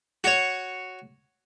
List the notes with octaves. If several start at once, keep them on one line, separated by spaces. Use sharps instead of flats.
F#4 C#5